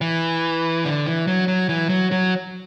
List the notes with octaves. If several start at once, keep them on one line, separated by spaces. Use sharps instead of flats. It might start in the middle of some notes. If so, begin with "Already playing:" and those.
E3
D3
E3
F#3
F#3
E3
F#3
F#3